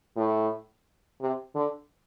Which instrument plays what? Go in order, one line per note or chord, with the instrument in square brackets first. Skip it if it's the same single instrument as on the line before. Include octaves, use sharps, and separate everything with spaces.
[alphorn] A2
C3
D3